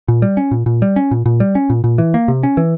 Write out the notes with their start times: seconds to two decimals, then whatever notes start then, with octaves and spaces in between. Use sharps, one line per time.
0.08 A#2
0.22 G3
0.37 C#4
0.51 A#2
0.66 A#2
0.82 G3
0.96 C#4
1.11 A#2
1.26 A#2
1.40 G3
1.55 C#4
1.70 A#2
1.84 A#2
1.98 E3
2.14 A#3
2.28 C3
2.43 C#4
2.57 E3